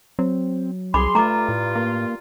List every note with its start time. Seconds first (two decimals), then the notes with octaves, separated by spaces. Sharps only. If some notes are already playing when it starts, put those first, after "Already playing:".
0.19 F#3 C4
0.94 C2 G#4 B5 C6 D6
1.15 G2 A3 F4 A#5 D6
1.49 A2
1.75 A#3